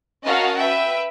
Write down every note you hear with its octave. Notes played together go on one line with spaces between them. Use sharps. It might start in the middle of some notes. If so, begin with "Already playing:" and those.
C#4 F#4 A#4 D#5 F5 A5
B4 E5 G5